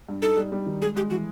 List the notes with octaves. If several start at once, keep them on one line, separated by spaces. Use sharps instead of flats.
G2
D#4 A4
G3
G3
D#3
G#3 G#4
G#3 G4
E3 F#4